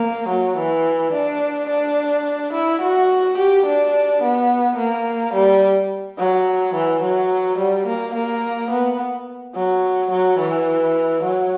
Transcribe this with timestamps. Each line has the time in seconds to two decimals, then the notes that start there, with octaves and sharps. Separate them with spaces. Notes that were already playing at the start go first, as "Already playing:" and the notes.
Already playing: A#3
0.29 F#3
0.58 E3
1.13 D4
1.70 D4
2.53 E4
2.82 F#4
3.38 G4
3.66 D4
4.23 B3
4.78 A#3
5.34 G3
6.19 F#3
6.75 E3
7.03 F#3
7.59 G3
7.87 A#3
8.14 A#3
8.71 B3
9.55 F#3
10.11 F#3
10.39 E3
11.23 F#3